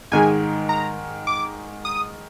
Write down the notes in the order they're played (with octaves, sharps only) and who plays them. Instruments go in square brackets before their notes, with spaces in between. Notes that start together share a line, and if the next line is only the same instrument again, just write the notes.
[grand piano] G#2 D#3 G#3 [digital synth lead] G#5
[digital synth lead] A#5
D6
D#6